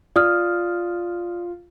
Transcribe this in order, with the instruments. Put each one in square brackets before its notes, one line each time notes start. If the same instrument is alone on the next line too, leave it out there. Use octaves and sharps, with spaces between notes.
[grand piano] F4 [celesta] D5 D#6 F6